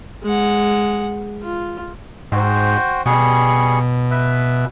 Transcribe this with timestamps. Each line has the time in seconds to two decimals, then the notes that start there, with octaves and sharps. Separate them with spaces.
0.23 G#3 F#5
1.44 F4
2.32 G#2 F#4 C5 G5
3.06 B2 G3 G#4 C#6
4.11 B4 E5